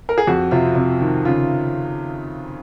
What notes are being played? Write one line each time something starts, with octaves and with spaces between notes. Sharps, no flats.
A#4
G#4
F2 F#4
C3 F4
C3
D#3
C#3 F4